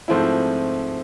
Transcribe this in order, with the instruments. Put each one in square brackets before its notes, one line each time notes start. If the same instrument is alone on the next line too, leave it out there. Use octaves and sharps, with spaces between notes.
[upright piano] G#2 F3 A3 C4 E4